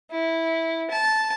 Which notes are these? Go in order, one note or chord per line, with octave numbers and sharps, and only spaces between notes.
E4
A5